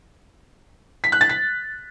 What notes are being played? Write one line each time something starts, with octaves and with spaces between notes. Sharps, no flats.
B6
F#6
A6
B6